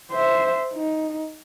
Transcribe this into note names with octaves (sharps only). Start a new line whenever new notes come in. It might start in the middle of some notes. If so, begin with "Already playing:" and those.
C5 E5
D#4